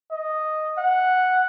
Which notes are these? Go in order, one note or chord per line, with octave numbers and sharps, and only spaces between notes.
D#5
F#5